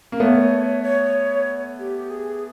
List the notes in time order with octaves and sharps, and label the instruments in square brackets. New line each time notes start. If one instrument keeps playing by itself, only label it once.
[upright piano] A#3
[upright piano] A3 B3 [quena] C#5
[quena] C#5
G4
G#4